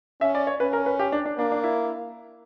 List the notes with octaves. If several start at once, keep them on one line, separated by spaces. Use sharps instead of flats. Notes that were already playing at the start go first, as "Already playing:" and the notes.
C#4 E5
D5
C#5
C#4 B4
A#4
B4
G4
D4
D4
A#3 D4
D4
E4